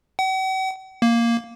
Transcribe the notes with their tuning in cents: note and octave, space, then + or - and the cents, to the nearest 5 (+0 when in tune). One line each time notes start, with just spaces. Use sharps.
F#5 +45
A#3 +0